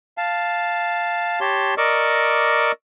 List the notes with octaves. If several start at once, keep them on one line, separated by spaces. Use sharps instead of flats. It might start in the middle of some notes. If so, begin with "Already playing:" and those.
F5 A5
G4 C#5 A5 C6
A#4 D5 D#5 C#6 D6 E6